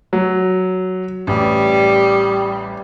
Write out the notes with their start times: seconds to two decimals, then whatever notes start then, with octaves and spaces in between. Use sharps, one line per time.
0.13 F#3
1.27 A1 G3